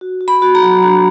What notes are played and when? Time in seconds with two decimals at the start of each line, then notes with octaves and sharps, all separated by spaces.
0.01 F#4
0.21 F#4
0.28 B5
0.42 F#4
0.55 A#5
0.63 F#3
0.83 D4 A#5